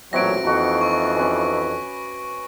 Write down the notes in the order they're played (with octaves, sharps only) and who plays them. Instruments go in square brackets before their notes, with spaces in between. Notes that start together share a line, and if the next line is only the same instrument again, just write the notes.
[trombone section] A1 A#2 F#3 [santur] C4 F#4 E5 [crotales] A#6 D7
[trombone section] F2 E3 D#4 [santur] A#3 F#4
[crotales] C#6
[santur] C#4 B4 D6